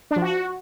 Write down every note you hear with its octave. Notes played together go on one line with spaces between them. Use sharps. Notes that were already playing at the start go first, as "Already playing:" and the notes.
D4
F3
F#4